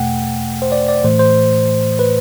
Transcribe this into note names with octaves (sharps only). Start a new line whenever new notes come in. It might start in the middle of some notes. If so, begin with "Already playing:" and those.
Already playing: E2 B2 A3 F#5 G5
C5
D5
D5
A2 E3 A3 C5
C5
B4